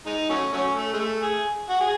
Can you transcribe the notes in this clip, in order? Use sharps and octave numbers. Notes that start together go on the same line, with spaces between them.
G#3 D#4
F#3 A3 C#4
F#3 A3 C#4
A3
G#3
A3
G#4
F#4
G#4